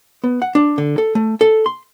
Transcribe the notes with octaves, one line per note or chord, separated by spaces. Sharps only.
B3
F#5
D4
D3
A4
A3
A4
C6